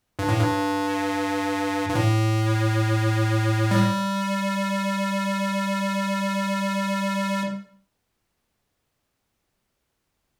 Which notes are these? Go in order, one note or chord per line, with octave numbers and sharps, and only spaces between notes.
G2
A2
G2
G2
A2
G3